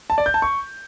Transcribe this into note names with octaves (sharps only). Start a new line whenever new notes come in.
A5
D5
G6
A5
C#6